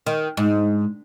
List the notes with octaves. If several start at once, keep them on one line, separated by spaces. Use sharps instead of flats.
D#3
G#2